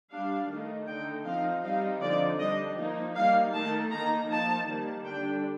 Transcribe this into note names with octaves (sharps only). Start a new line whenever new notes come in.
G3 D4 F5
D#3 A3 D#4
D3 A3 D#4 G5
F3 C4 D#4 F5
G3 C4 D#4 F5
D3 F3 C4 D#4 D5
G3 D4 D#5
F3 A#3 D#4
G3 A#3 D#4 F5
D#3 A3 D#4 A5
D#3 A#3 D#4 A#5
F3 A#3 D#4 A5
D#3 G3 A#3
D3 G3 D4 G5